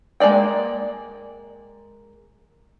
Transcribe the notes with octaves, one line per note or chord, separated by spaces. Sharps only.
G#3 A#3 D5 G5